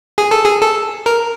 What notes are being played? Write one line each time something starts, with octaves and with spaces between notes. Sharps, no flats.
G#4
A4
G#4
A4
A#4